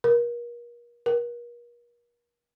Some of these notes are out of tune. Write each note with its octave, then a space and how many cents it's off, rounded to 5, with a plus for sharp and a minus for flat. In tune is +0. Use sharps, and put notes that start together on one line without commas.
A#4 +35
A#4 +40